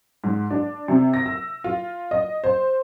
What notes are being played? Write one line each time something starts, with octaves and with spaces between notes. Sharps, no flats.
G#2
D4
C3
A#6
E6
F4
D#5
C5